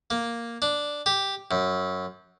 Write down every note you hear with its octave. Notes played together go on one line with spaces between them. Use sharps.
A#3
D4
G4
F#2